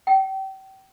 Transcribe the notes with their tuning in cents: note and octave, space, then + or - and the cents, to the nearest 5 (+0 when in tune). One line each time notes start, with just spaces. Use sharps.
G5 -35